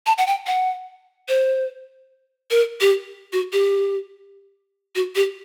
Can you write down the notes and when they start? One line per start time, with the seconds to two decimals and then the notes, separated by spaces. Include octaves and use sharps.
0.06 A5
0.18 F#5
0.27 G5
0.47 F#5
1.29 C5
2.51 A#4
2.81 G4
3.33 F#4
3.53 G4
4.95 F#4
5.16 G4